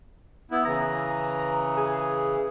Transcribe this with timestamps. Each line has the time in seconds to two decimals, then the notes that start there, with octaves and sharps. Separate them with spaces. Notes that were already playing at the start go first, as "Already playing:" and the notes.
0.51 B3 E4
0.65 C#3 E3 A#5
1.77 G#4